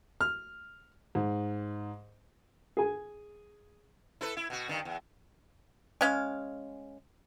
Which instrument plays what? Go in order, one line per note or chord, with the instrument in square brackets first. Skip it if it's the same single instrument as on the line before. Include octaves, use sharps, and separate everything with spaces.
[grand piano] F6
G#2
[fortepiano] G#4 G#5
[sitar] E4 A4 B4
E4
B2 F#4
G2 D#3
E2
[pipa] G#3 C#4 F5